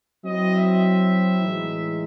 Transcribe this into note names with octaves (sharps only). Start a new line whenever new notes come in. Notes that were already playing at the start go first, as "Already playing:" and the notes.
F#3 C4 E4 D#5
E5
A2 E3 G#3 D#4